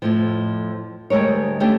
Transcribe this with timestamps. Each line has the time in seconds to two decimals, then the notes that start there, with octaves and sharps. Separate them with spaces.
0.02 F2 A2 F3
1.10 D2 G3 G#3 A#4 C#5
1.60 G3 A3 C#4 D4 G4